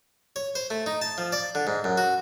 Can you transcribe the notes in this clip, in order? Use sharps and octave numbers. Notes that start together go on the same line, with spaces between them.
C#5
C5
A3
D#4
A5
F3
D5
D3
G#2
F#2
F#4